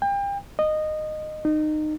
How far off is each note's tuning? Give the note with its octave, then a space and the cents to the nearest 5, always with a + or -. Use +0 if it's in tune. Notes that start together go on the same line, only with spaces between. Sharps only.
G5 +35
D#5 -15
D#4 -25